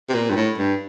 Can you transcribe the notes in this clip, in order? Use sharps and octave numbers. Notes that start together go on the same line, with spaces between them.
C3
A#2
G2
A2
G2